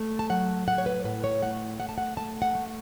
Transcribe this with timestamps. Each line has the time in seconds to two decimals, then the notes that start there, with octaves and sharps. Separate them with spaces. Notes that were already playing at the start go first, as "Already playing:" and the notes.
Already playing: A3
0.19 A5
0.29 F#3 F#5
0.67 A2 F#5
0.78 C#5
0.86 B4
1.04 A2 B4
1.24 C#5
1.42 A3 F#5
1.80 A3 F#5
1.89 A5
1.98 F#5
2.17 A3 A5
2.42 F#5
2.55 A3